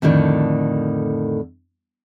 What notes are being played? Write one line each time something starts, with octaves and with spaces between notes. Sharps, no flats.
F2 A2 D3 D#3